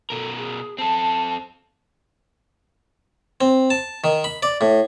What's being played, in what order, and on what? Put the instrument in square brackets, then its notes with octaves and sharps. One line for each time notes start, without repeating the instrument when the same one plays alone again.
[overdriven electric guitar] B2 A#4 [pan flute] A4
[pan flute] G#4
[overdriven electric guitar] C4 A4 [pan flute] A5
[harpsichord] C4
A5
D#3
B5
D5
A2